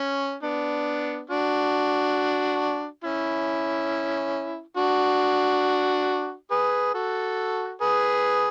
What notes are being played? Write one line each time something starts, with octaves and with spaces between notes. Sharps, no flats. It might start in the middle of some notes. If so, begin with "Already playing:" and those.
Already playing: C#4
B3 D4
D4 F#4
C#4 E4
D4 F#4
G#4 B4
F#4 A4
G#4 B4